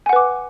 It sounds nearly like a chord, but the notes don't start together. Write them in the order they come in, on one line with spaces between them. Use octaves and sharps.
G#5 F#5 B4 D6